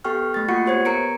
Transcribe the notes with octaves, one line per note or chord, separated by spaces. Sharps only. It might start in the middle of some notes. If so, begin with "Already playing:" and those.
B3 G4 A4 G5 C#6 F6
A3 A6
A#3 F4 F#4 F#5 C#6 C#7
B3 G4 C5 C#5 G#6
B3 A#4 A#5 C#7 D7